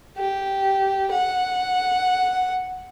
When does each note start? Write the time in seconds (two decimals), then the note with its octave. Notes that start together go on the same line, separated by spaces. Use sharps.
0.17 G4
1.11 F#5